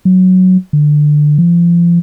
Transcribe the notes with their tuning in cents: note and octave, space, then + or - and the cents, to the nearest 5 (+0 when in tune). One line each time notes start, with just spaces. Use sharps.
F#3 +0
D3 +15
F3 -30